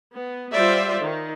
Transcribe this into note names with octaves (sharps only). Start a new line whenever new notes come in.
B3
G3 F4 C5 D5 E5
D#3